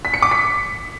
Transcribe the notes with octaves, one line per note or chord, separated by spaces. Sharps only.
B6
C#7
D6
B6